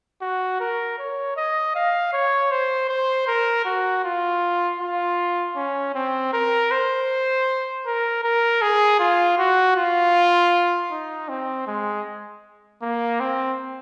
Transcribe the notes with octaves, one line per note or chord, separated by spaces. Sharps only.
F#4
A#4
C#5
D#5
F5
C#5
C5
C5
A#4
F#4
F4
F4
C#4
C4
A#4
C5
A#4
A#4
G#4
F4
F#4
F4
D#4
C4
G#3
A#3
C4